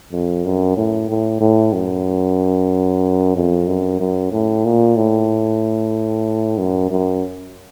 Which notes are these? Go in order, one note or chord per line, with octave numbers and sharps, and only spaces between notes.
F2
F#2
A2
A2
A2
F#2
F2
F#2
F#2
A2
A#2
A2
F#2
F#2